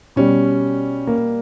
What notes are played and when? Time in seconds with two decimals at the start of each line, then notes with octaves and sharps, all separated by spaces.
0.16 B2 G3 C#4
1.07 A#3